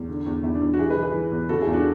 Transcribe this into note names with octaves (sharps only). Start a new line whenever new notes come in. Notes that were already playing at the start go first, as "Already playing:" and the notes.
Already playing: E2
D3
E2
E2 E4
D4
E2
F#4
E3 E4 G#4
G#4 B4
E3
G#4 B4
E3
E2
C#3 F#4 A4
E4 G#4
E2
D4 F#4